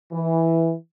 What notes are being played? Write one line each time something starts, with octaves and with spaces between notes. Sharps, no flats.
E3